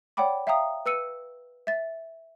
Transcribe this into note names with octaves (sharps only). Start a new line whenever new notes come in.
C#5 D5 F#5 G5 B5 D6
E5 F5 G5 A#5 D#6
B4 E6 C#7 D#7
E5 A6